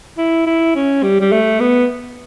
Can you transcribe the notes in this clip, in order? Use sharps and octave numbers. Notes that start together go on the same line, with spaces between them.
E4
E4
C#4
G3
G3
A3
B3